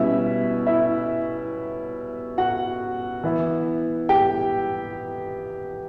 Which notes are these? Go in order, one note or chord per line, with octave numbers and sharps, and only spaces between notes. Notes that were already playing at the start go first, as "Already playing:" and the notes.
Already playing: B2 G3 C#4 E4 E5
E4 E5
F#4 F#5
E3 B3 E4
G4 G5